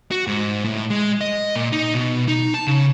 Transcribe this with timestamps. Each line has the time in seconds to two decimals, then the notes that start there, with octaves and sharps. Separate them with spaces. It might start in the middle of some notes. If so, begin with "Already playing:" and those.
0.11 F#4
0.27 G#2
0.65 A2
0.90 G#3
1.21 D#5
1.56 A#2
1.72 D#4
1.94 B2
2.28 D#4
2.54 A5
2.67 C#3